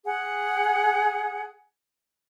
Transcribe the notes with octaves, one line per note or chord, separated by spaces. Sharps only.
G#4 F#5